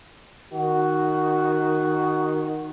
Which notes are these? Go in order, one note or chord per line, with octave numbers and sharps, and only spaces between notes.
D#3 F#4